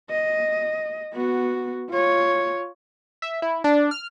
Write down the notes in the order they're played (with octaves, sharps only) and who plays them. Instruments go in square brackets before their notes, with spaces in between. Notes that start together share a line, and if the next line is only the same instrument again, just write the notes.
[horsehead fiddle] D#5
B3 F#4
F4 C#5
[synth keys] E5
E4
D4
F6